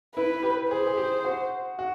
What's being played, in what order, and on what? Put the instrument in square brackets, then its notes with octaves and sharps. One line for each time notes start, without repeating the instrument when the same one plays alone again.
[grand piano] E4 [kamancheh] B4
[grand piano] G4
[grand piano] G#4 [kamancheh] C5
[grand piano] G#4
G4
F#4
F#4